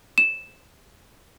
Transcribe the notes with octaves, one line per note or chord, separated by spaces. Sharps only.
E7